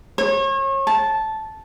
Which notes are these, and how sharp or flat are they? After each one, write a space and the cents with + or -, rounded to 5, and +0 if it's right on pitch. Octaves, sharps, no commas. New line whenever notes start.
C#5 -35
A5 -10